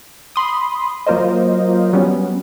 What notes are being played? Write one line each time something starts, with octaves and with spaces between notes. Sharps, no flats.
B5 C6 D#6
F#3 A#3 F4 A#4 C5 D#5
F#3 G3 B3 C#4